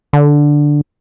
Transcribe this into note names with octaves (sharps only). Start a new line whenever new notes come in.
D3